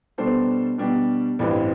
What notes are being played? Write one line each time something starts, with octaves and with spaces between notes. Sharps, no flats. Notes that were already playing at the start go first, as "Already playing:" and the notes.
B2 G3 D4 A4 C5
B2 G3 D4 G4
A1 G2 E3 G3 C4